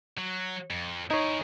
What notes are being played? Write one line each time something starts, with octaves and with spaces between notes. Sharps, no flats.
F#3
F2
D#4 E4 G#4 C#5